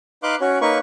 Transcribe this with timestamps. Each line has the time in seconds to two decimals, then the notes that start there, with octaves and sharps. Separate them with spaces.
0.23 D#4 B4 F5 C6 D6 F#6
0.41 C#4 F#4 C#5
0.61 A#3 D#4 B4 C#5 C#6